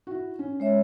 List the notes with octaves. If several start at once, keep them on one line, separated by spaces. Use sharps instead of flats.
E4 F#4
C#4
G#3 C#5 E5